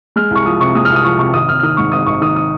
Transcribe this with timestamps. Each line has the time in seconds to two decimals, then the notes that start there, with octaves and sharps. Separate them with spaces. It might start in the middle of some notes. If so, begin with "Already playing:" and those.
0.16 G#3 F6
0.31 C2 C#6
0.45 F3 D#6
0.60 C3 C#6
0.75 G#3 D#6
0.85 C2 F6
0.95 D#6
1.04 F3 C#6
1.18 C3 C#6
1.33 G#1 D#6
1.49 G#1 F6
1.59 F6
1.63 D#3 D#6
1.77 G#2 C#6
1.92 G#1 D#6
2.06 G#1 C#6
2.21 D#3 D#6
2.36 D#6